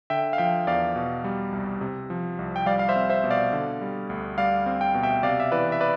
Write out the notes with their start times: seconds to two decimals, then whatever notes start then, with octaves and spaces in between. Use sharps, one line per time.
0.10 D3 E5 G5
0.33 F5
0.38 F3 E5 G5
0.67 E2 D5 F5
0.96 B2
1.24 G3
1.52 C2
1.81 C3
2.10 F3
2.39 C2
2.56 G5
2.66 G3 D5 F5
2.79 F5
2.89 C5 E5
2.96 C4
3.10 C5 E5
3.24 B2
3.31 D5 F5
3.53 D3
3.81 G3
4.10 D2
4.38 G3 D5 F5
4.66 C4
4.81 G5
4.94 B2
5.03 E5 G5
5.23 C3 D5 F5
5.40 E5
5.52 E3 B4 D5
5.72 E5
5.80 B4 D5